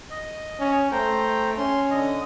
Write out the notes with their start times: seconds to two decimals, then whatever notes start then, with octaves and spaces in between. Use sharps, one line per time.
0.10 D#5
0.60 C#4
0.92 A3 C5 G5 A#5
1.57 C#4 C6
1.91 D3 D#5